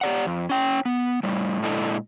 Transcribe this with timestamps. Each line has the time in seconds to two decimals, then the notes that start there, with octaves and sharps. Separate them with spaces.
0.01 G4 D5 F#5
0.27 F2
0.49 C#4 G5
0.85 B3
1.23 A2 G3
1.62 A#2 G#3 D4 E4 A4 D#5